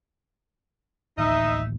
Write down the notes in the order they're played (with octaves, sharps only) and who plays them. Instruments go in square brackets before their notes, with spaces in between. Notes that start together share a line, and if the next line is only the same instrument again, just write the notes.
[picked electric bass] D1 A1 D#2 [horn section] D#4 D#5 E5